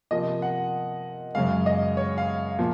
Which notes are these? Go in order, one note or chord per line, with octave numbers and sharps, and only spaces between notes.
C3 F3 A#3 D#5
F#5
F#2 C#3 G#3 F5
D#5
C#5
F5
A#2 F3